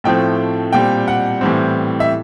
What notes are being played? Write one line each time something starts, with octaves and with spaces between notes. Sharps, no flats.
A2 F3 A3 C4 G5
A#2 G3 C4 G5
F#5
A2 E3 G3 C4
E5